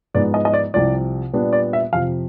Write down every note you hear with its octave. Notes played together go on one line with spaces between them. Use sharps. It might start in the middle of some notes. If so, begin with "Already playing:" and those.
G#2 F3 G#3 B3 D5
D#5
D#5
D5
C2 C3 F3 D5
A#2 G3 B3 D4
D5
E5
F2 C3 F3 F5